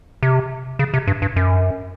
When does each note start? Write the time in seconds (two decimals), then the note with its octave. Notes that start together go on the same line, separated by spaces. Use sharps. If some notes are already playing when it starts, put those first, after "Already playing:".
0.23 C3
0.79 C#3
0.94 C3
1.07 G2
1.22 G2
1.36 F#2